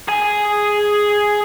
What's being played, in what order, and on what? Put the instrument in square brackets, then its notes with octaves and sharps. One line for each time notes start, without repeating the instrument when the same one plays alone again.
[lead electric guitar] G#4 G#5